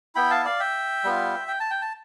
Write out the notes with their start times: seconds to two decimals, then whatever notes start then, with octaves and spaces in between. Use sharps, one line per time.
0.15 B3 E4 G5 B5
0.31 F5 A5
0.45 D5 F5
0.60 E5 G5
1.04 G3 B3 F4
1.48 G5
1.60 A5
1.70 G5
1.82 A5